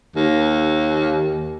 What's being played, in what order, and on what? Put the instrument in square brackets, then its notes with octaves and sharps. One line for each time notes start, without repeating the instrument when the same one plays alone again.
[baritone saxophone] D#2